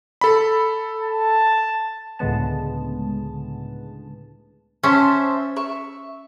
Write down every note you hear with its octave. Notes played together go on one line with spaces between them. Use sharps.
A4 B5
A5
C#2 A2 D3 G#3 B3 A5
C#4 C5 E5 A5
E5 C#6